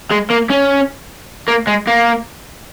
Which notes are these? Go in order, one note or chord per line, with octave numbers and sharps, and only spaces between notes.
G#3
A#3
C#4
A#3
G#3
A#3